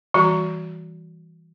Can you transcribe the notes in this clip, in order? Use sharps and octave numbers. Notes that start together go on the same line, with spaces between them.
E3 G3 F#4 A#5